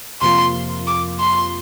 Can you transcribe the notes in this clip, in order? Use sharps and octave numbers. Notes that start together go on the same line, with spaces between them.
F2 C3 F3 A#3 F4 C6
D6
C6